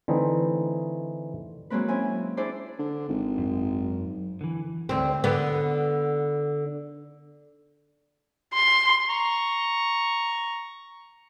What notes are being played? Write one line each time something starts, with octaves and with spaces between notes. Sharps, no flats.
D3 E3 A3 C4 D#4
F#3 G#3 A#3 C4 B4
C4 C#4 E4 G#5
D4 E4 G#4 C5 D5
D3
G#1
F#2
D3 E3
D2 C4
D3 B3
C6
A#5 C#6